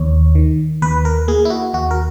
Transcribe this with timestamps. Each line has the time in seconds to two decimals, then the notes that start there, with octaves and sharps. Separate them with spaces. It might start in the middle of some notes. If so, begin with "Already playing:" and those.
Already playing: D#2 C#5
0.35 D#3
0.82 D#2 B4
1.05 A#4
1.28 A#3 G#4
1.45 E4
1.50 F#4
1.74 D#2 F#4
1.91 A#4